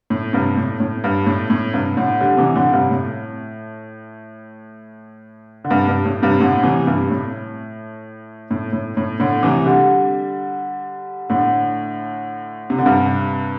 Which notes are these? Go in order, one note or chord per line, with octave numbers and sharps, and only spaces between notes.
A2
G2 C3
A2
A2
G2
A2
A2
G2 C3
A2 D3
D3 G3
C3 E3
A2 D3
G2 C3
A2
D3
G2 C3
G2
A2
G2 C3
A2 D3
C3 E3
G2 C3
A2
A2
A2
A2
A2 D3
C3 E3
D3 G3
A2 D3
C3
D3
G2 C3